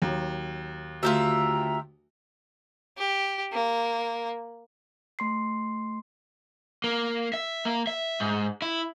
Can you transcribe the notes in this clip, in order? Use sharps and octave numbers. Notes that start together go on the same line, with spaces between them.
D#2 F#3
D2 F4 G4 E5 A#5
G4
A#3
A3 C6 C7
A#3
E5
A#3
E5
G#2
E4